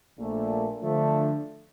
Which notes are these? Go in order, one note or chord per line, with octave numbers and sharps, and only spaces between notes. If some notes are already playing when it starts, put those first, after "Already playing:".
A#1 A#2 A3
D3 F3 A3 D4